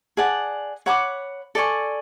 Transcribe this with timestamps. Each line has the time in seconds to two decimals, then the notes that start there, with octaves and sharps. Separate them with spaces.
0.17 G#4 D5 F#5 A5
0.86 C#5 F#5 B5 D6
1.55 A4 D5 G#5 C#6